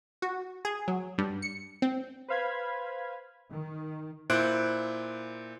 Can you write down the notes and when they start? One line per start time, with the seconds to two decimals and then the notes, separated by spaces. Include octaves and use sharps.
0.22 F#4
0.65 G#4
0.88 F#3
1.18 G2
1.42 C#7
1.82 C4
2.28 B4 C5 F5 B5 G#6
3.51 D#3
4.30 A#2 E4 C5 F#6 D7